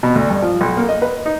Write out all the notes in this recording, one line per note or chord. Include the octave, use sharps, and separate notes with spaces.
B2
D2
G2
F3
B1
A#3
D#5
B4
D#4